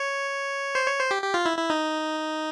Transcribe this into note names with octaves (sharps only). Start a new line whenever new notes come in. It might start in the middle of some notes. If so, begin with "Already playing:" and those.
Already playing: C#5
C5
C#5
C5
G4
G4
F4
E4
E4
D#4